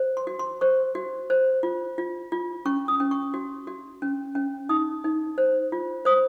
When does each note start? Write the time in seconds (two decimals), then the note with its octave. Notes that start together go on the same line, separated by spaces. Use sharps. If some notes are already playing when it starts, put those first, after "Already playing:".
Already playing: C5
0.17 C6
0.27 F#4
0.39 C6
0.61 C5 C#6
0.95 F#4
1.30 C5
1.63 F4
1.98 F4
2.32 F4
2.65 C#4 C#6
2.88 D#6
3.00 C#4
3.11 C#6
3.34 F#4
3.67 F#4
4.02 C#4
4.35 C#4
4.69 D#4 D#6
5.04 D#4
5.38 C5
5.72 F4
6.05 C5 D#6